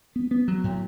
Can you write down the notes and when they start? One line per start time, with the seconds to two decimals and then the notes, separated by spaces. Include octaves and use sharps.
0.16 B3
0.31 B3
0.48 F#3
0.64 A2